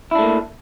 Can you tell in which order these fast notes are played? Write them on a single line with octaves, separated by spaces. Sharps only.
E4 D4 A3 A#3